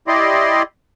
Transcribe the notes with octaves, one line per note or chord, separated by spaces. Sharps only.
E4 G4 D5 D#5 C6